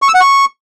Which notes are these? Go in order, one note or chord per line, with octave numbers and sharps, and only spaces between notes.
C#6
E6
F#5
C#6